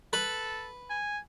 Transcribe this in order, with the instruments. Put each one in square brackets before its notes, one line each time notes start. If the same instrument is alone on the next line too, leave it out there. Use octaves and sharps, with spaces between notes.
[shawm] A4 [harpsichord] B4
[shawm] G#5